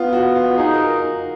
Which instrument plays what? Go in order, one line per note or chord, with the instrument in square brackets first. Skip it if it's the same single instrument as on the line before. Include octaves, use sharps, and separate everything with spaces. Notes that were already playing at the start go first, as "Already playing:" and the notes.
Already playing: [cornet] B3 [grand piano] F4
[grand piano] F#4
F4
[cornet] D#4 [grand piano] G#4
[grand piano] A#4